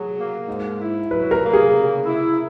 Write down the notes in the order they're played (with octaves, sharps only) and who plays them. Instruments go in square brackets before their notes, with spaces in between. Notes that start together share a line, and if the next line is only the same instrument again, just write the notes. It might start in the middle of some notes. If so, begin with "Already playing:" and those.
Already playing: [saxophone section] F#3 [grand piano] G#4
[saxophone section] A#3
G#2
E4
[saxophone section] F#3 [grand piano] B4
[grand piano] A#4
[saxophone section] A#3
[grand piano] G#4
[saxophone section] C#3
E4